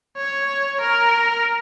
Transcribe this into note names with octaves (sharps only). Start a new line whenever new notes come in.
C#5
A#4